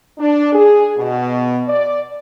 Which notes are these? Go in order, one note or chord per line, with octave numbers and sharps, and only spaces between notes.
D4
G#4
B2
D5